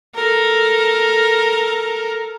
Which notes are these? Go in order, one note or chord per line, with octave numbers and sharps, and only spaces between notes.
A4 A#4